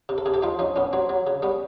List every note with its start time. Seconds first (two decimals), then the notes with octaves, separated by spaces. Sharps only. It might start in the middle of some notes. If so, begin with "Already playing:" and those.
0.09 C3
0.18 A4
0.26 C3 G#4
0.34 G4 A4
0.42 F3 D#4 F4
0.59 F3 C#4 D#4
0.76 A2 B3 C#4
0.93 F#3 C4
1.09 F#3
1.27 C#3
1.42 G3 B3 C#4